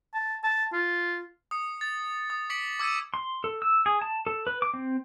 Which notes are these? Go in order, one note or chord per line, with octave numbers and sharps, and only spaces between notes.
A5
A5
F4
D#6 C#7
A6
D#6
D6 B6 C#7 D7 F#7
D6 E6 G#6 C#7 D#7
C6
A4
E6
G#4
A5
A4
B4
D6
C4